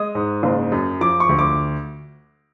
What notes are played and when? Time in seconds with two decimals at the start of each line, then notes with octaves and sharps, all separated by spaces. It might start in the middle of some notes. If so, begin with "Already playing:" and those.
Already playing: G#3 D#6
0.15 G#2
0.43 F#1
0.72 F#2
1.01 F3 D6
1.20 C#6
1.29 D2
1.39 D6